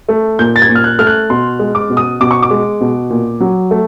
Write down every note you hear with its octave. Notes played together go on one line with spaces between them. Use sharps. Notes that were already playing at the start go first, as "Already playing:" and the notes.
A3
A#2 G6
A6
G#6
A#2
F6
F#6
A3 F6
F#6
B2 C6
G#3
D6
B2
D#6
B2 D6
C#6
D6
G#3
B2
A#2
F#3
A3